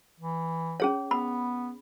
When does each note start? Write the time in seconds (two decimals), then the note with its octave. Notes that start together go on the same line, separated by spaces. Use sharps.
0.20 E3
0.80 C#4 G#4 C#5
1.11 B3 B5